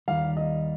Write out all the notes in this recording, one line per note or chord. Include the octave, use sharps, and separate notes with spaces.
D#2 D#3 G3 F5
D#5